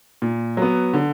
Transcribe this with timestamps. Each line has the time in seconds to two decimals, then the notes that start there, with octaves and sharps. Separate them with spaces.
0.22 A#2
0.57 F#3 B3
0.94 D3